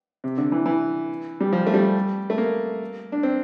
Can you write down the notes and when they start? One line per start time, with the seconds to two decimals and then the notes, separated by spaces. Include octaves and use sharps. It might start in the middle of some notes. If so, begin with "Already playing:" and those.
0.24 C3
0.38 D3
0.52 E3
0.66 E3
1.40 G3
1.53 F3
1.67 A3
1.74 G3
2.30 A3
2.38 A#3
3.12 D4
3.23 C4